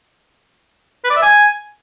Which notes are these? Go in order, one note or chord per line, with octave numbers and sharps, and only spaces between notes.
B4
D5
E5
G#5